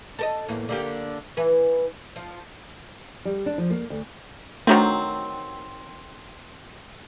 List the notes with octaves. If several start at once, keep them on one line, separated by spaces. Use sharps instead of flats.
A4 A#4 D#5
E2 A2 A#3
D3 A#3 G4
E3 B4
F3
G3
D4
F3
A#3
D2
D#3 F#3 A3 C4 D4 F#4